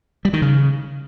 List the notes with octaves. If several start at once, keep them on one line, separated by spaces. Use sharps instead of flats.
G3
D#3
C#3